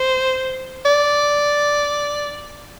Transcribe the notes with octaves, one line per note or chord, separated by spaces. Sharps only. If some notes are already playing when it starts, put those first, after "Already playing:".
Already playing: C5
D5